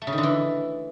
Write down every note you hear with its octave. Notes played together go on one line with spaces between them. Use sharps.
A3
C#3
D#3
D3
E3